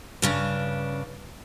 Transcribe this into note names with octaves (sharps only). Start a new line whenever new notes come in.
G2 C#3 D4